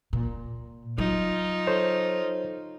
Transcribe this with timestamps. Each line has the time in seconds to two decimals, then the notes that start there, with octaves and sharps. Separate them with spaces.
0.13 A#2
0.98 F#3 D#4 F4
1.67 A4 C5 C#5